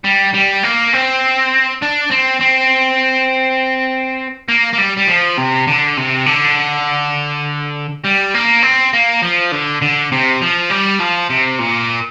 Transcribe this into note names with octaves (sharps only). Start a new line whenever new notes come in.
G3
G3
A#3
C4
D4
C4
C4
A#3
A#3
G3
G3
F3
C3
D3
C3
D3
G3
A#3
C4
A#3
F3
D3
D3
C3
F3
G3
F3
C3
A#2